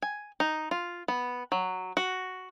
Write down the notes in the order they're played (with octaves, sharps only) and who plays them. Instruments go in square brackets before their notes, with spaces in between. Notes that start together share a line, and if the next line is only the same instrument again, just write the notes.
[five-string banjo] G#5
D#4
F4
B3
F#3
F#4